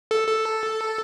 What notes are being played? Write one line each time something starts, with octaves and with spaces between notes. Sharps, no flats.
A4
A4